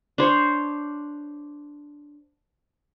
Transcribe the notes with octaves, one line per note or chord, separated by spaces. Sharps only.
D4 C5 C#5